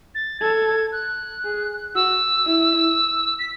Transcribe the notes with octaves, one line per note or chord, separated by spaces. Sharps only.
A6
A4 G#6
F#6
G#4
F#4 E6
E4
B6